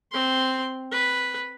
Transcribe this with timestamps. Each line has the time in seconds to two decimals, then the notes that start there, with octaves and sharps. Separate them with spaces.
0.12 C4 C6
0.92 B4